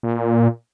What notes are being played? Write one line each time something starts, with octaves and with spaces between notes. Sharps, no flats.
A#2